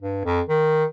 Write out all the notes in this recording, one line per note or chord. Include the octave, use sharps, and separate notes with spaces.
G2
F2
D#3